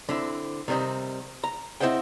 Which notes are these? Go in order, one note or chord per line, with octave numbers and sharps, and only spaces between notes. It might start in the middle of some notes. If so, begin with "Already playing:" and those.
D3 C4 E4
C3 D#3 G3 C4 D#4
A#5
C4 E4 C5 D#5 F#5 G5